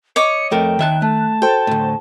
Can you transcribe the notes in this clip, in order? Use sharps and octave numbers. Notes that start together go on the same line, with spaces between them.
C#5 D#5 D6 C#7
F2 A3 A#4 G5
D#2 D#3 E5 A5 F#6
A3 A5
F#4 A4 C5 G5
D2 A2